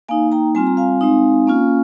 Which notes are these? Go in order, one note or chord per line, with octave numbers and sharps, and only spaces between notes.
A#3 D#4 F5 G#5
G5 A#5
G3 C4 F4 G#5
A#5
F5 G#5
G#3 C4 D#4
A#3 C#4 F4